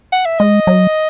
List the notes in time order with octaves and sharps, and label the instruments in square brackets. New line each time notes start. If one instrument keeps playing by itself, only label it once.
[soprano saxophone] F#5
E5
[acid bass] G#3 [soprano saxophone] D#5
[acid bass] F#3